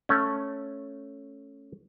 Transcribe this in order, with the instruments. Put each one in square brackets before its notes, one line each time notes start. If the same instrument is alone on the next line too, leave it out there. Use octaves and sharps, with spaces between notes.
[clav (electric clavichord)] A3 C#4